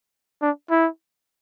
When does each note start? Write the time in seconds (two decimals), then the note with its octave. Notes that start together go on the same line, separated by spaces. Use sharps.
0.42 D4
0.71 E4